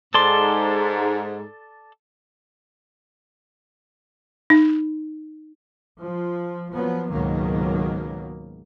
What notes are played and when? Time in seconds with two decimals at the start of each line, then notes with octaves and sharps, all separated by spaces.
0.14 G#2 A4 D5 C6
4.50 D#4
6.01 F3
6.73 F3 F#3 B3
7.10 C#2 G#2 B2 D#3 F#3 A#3